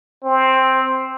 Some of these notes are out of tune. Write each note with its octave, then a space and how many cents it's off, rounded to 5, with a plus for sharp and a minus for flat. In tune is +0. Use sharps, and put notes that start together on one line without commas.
C4 +5